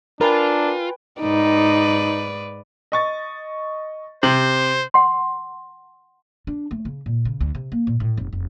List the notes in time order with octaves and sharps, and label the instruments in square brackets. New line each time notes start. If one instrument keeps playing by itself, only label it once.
[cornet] D4 [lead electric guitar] F4 [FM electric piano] A#4 [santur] B4 G5 G#5
[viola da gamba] G#2 B4 D5 [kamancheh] D#4
[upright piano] D#5 C#6 A6
[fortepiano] C3 [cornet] C5 [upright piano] F#7
[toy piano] F#5 C6
[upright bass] D4
A3
C#3
A#2
C#3
D2
C3
A#3
A#2
A2
F1
F1